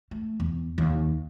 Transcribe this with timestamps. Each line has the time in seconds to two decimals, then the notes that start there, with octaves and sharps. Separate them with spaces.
0.11 A3
0.40 E2
0.78 D#2